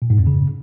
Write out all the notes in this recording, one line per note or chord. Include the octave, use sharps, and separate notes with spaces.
A#2
G#2
F2
C#3